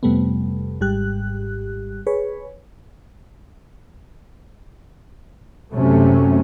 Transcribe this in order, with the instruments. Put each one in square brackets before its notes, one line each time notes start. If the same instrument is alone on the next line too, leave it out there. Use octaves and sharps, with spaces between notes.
[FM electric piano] F2 C3 G3 A3 B3
G#1 G#2 G3 G4 F#6
G#4 B4 C#5
[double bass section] F#1 C3 F#3 A3 C#4